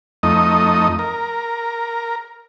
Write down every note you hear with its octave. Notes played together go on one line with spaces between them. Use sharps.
F2 A3 D#4 D#5
A#4